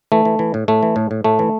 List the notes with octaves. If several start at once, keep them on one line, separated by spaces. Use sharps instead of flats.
E3 A3
E3
E3
A2
A2 A3
E3
A2
A2
A2 A3
E3